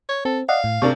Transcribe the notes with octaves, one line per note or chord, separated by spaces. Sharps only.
C#5
C4 A4
D5 D#5 F5 F#5
A2
C3 D4 A#4 C#6